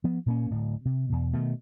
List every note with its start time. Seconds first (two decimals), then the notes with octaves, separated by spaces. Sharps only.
0.04 F3 B3
0.26 A#2 A#3 C#4
0.50 D1 A2
0.85 C3
1.10 E2 B2
1.33 B2 D#3 A3